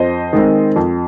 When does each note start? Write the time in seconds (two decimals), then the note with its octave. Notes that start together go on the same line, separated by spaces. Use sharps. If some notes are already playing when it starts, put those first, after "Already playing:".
Already playing: F2 C5 D#5
0.33 D#3 G#3 C4
0.76 F2